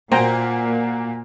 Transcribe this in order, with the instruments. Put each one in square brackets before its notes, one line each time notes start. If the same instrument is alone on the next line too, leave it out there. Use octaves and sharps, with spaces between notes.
[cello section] A#2 [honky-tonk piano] A#3 F#4 G#5 [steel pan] C5 G5 A#5